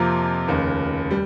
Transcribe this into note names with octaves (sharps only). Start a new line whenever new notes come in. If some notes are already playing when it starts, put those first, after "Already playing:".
Already playing: F2 C3 F3 A#3 F4
F1 D#2 C#3
G3